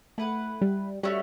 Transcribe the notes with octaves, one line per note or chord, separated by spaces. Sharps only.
A3 E4 B4 F#5
G3
G3 A3 C#4 F#4 C#5